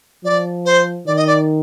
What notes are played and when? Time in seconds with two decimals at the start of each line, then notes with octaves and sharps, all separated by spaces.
0.24 F3 D5
0.66 C5
1.06 D#3 D5
1.17 D#5
1.27 D5